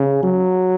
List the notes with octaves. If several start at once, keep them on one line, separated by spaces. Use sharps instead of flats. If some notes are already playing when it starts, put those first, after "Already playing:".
Already playing: C#3
F#3